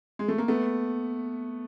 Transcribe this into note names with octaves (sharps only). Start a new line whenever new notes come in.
G#3
A3
A#3
A3 B3